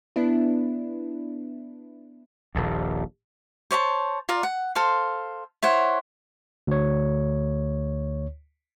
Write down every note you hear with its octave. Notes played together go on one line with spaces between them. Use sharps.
B3 D4 E4
D#1 A#1 D#2
C5 C#5 D#5 A5
F4 A#4 D5
F#5
A4 C5 F5 C6
E4 C5 C#5 F#5
D2 C#5